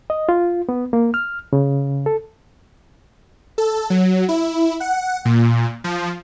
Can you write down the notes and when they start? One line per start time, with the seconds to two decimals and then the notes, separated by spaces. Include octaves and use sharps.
0.10 D#5
0.29 F4
0.69 B3
0.93 A#3
1.14 F6
1.53 C#3
2.06 A4
3.58 A4
3.90 F#3
4.29 E4
4.80 F#5
5.25 A#2
5.84 F3